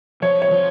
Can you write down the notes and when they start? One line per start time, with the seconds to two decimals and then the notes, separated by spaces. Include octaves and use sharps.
0.22 F3 C#5
0.42 C#5
0.51 F3